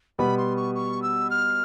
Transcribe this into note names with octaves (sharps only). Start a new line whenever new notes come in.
B2 G3 B3 B5
C6
C#6
C#6
E6
F6